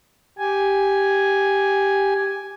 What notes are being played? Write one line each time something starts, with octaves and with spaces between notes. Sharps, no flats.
G4 G#5